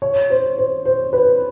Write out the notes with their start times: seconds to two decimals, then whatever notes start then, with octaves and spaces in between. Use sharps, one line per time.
0.02 C#5
0.30 C5
0.58 C5
0.85 C5
1.13 B4